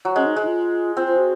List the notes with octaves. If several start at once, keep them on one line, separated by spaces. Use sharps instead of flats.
F#3
G#3 C#4
D#4
G#3
D#4
F4
C4 F4
F4
F#4